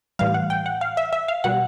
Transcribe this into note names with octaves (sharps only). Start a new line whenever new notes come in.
A2 E3 G3 F5
F#5
G5
F#5
F5
E5
E5
F5
B2 G3 F#5